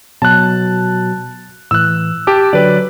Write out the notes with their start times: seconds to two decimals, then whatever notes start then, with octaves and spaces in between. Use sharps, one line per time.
0.22 B2 F#3 A5 F#6
1.71 A2 E3 E6 F#6
2.27 G4 A5 D6
2.53 D3 F#3 B4 D5